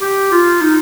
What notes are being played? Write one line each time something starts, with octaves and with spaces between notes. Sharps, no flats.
G4
F4
D#4